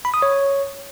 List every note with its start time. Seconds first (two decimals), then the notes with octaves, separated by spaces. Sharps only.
0.05 B5
0.14 D#6
0.22 C#5